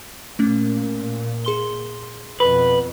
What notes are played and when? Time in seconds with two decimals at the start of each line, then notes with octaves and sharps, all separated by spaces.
0.39 A#2 A3 C#4
1.45 G#4 C6 G7
2.40 F2 B2 B4